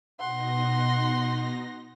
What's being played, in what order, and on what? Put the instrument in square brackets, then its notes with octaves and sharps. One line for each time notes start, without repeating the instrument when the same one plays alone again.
[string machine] B2 D#4 A#6 [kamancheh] F#5 C6